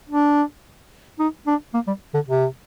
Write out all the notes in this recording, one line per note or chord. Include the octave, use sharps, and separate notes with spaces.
D4
D#4
D4
A#3
G3
D3
C3